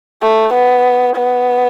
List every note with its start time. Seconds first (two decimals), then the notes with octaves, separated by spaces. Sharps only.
0.22 A3
0.54 B3
1.16 B3